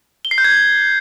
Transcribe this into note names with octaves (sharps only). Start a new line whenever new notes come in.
G7
C7
G6
G#6